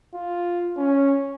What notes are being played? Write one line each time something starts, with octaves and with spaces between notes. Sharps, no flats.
F4
C#4